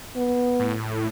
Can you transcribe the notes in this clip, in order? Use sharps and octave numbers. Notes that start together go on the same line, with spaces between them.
B3
A2